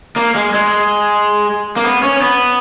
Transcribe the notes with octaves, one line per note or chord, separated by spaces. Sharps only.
A#3
G#3
G#3
A#3
B3
C#4
B3